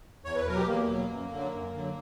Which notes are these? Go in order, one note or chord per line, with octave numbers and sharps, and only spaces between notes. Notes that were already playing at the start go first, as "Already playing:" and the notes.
E2 C#5
B4
B2 F#3 A#4
G4
E2 A#3
B2 F#3
F#2
D3
F#3
F#2
D3 F#3